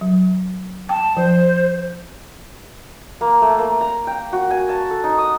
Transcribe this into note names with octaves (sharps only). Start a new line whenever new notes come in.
F#3
G5 A5
F3 C5
A#3
A3
A#3
A#5
G5
F#4
G#5
A5
A4
D#4
D#6